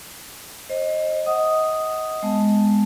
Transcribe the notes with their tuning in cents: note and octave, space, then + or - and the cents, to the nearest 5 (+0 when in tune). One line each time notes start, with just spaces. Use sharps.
C5 +30 D#5 +0
D#5 +25 F#5 +10 D#6 +0
G#3 +0 B3 +20 A5 +0